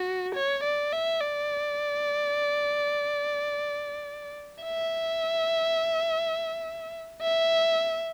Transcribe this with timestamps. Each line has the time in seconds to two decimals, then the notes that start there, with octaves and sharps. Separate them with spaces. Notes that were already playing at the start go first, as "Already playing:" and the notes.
Already playing: F#4
0.35 C#5
0.64 D5
0.93 E5
1.21 D5
4.64 E5
7.22 E5